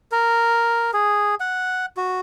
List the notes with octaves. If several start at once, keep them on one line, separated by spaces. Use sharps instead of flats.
A#4
G#4
F#5
F#4